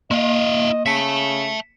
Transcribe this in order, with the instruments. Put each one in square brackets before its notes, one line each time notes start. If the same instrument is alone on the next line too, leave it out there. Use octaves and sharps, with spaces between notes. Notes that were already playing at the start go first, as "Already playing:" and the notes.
[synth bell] A#3 [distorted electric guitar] E4 F5 [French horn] D#5
[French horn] C#3 [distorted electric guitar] E5 A5 [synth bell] B6 C#7